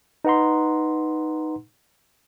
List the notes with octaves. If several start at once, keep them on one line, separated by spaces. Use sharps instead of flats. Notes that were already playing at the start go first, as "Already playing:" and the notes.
D#4 B4 F#5 A#5 C6